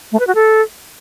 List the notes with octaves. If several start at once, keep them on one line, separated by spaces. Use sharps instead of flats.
A3
B4
F#4
A4